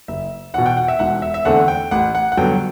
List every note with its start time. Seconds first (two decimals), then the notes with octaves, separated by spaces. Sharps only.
0.08 F#1 E5
0.54 E2 B2 F#5
0.66 G5
0.77 F#5
0.88 E5
0.99 E1 F#5
1.22 E5
1.34 E5
1.45 E2 D3 A3 C4 F#5
1.68 G5
1.91 A1 F#5
2.15 F#5
2.32 F#5
2.37 G2 D3 F#3 B3 G5